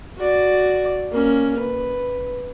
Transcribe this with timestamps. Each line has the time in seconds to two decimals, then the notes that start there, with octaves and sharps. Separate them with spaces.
0.17 F#4 D5
1.12 A#3 C#4
1.58 B4